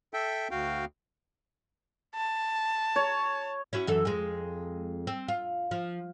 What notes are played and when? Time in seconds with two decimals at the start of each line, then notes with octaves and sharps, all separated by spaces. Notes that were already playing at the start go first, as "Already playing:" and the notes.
0.14 A4 E5 G5
0.51 D2 F#4 F5 G5
2.15 A5
2.96 C#5
3.73 C#4 E4 F#4
3.87 F#2 E3 A4
4.05 F2 G#3
5.07 C4
5.28 F4
5.71 F3